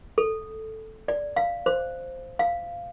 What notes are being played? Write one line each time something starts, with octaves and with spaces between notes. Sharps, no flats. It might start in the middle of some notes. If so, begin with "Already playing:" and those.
A4
D5
F5
C5
F5